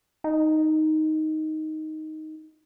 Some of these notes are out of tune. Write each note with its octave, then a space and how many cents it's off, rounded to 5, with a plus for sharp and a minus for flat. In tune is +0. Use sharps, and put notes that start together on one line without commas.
D#4 +5